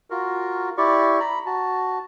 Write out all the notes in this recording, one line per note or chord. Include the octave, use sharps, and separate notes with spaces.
F4 F#4 A#4
E4 G4 D5 C#6
A#5 B5
F#4 A5